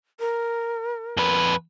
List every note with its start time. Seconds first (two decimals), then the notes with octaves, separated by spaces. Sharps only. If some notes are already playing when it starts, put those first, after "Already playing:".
0.20 A#4
1.17 F2 B4